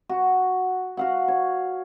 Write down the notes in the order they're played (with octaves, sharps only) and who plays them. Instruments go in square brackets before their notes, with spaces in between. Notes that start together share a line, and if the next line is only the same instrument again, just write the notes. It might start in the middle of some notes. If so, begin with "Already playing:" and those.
[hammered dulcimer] F#4
F#4 F5 F#5
C#5